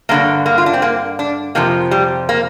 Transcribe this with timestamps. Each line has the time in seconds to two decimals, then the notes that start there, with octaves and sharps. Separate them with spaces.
0.09 G2 D3 F3 A#3
0.46 A#3
0.58 F4
0.66 D4
0.74 C4
0.82 A#3
1.19 D4
1.55 F2 C3 F3 A#3
1.91 G3
2.29 A#3